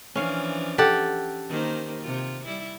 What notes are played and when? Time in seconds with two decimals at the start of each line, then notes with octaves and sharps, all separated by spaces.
0.15 E3 F3 C#4 D4 F5
0.78 G4 A4 F#5
1.49 D#3 A#3 C5
2.02 C3 F4
2.45 G3 E4